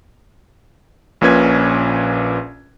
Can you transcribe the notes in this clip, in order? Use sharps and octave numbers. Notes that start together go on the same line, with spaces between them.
A#1 A#2 C#4 B4 G#6